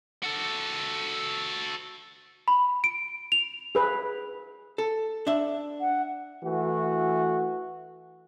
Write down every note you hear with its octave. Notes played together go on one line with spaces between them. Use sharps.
F#4 A4
B5
D7
F7
G#4 B4
A4
D4 E5
F#5
E3 A3 F#4